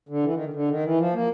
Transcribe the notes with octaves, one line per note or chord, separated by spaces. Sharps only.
D3
E3
D#3
D3
D3
D#3
E3
F3
A#3